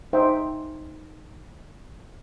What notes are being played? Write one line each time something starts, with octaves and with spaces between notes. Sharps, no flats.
D#4 G#4 C5 E5 G5